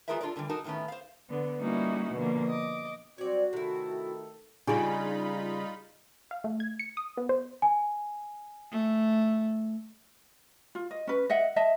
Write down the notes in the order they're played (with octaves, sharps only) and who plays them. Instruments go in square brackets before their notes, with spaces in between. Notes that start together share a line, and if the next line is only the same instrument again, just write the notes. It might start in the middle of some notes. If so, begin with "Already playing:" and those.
[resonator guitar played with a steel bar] G#3 F4 G#4 A#4 B4 E5
D4 F4 A4 A#4 D5
A2 D3 E3 G3
D#4 F#4 A4 A#4
A2 D#3 A3 B3 C#4
C5 F5
[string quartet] D3 B3
G3 A#3 C#4 D#4 E4 F#4
B2 D3 F3 A#3
D#5 D6
[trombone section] F#3 G3 C4 [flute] F#4 [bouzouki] C#5 D5
[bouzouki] C3 E4 [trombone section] D#3 A3 A4
[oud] C#3 G3 [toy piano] D4 G4 G#4 [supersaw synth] D#4 F4 B5
[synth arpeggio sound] F5
A3
G#6
C#7
D#6
B3
C5
[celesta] G#5
[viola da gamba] A3
[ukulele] F4
D#5
C#4 B4
D#5 E5 F#5
D#5 E5 A5